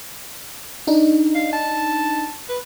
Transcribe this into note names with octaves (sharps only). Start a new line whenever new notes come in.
D4 D#4
F5
A5
B4